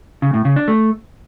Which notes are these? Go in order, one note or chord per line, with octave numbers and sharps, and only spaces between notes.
C#3
A2
C#3
D4
A3